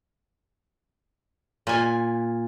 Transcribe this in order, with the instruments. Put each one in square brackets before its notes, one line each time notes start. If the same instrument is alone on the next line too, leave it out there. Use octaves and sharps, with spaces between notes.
[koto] A#2 G#5